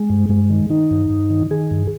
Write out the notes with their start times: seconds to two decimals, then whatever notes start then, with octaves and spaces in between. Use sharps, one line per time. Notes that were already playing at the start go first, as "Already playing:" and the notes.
Already playing: G#3
0.10 G2
0.29 G2 G#3
0.50 D#3
0.70 D#3 D#4
0.91 G2
1.10 G2
1.30 D#3
1.51 D#3 G#4
1.71 G2